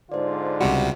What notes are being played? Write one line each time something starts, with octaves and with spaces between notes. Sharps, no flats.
G#2 D3 F4 C5 D5
C#2 C3 G3 F#4